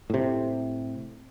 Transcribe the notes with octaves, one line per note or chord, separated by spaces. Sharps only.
A2 C3